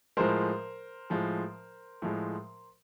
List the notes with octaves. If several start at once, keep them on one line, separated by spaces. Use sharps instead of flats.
A2 F3 G#3 A#4 C5
A2 F3 G#3
A2 F3 G#3